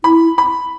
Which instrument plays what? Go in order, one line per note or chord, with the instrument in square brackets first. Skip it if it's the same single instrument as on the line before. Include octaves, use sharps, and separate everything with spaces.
[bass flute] E4 [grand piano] B5
[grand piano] B5